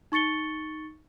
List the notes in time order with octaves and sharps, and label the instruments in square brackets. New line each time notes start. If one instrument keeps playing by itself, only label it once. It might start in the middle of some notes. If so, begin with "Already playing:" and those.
[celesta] D#4 C#6 A6 C#7 G7